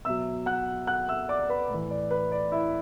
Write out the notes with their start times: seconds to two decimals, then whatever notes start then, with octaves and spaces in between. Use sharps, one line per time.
0.05 B2 F#3 E5 E6
0.46 F#5 F#6
0.87 F#5 F#6
1.08 E5 E6
1.29 D5 D6
1.49 B4 B5
1.70 A2 E3
1.91 D5
2.11 B4
2.32 D5
2.52 E4 E5